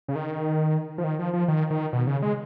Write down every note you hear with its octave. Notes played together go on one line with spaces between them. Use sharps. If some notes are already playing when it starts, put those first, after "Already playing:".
C#3
D#3
F3
D#3
F3
F3
D#3
D#3
B2
C#3
G#3